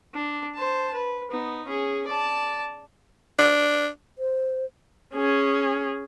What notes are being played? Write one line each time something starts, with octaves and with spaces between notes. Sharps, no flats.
D4
C5 A5
B4
B3 D#4
C#4 G#4
D5 A5
D4
C5
C#4 G#4